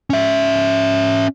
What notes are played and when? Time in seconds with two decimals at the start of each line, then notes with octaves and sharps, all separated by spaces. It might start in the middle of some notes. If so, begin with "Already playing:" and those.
0.10 C#4 E5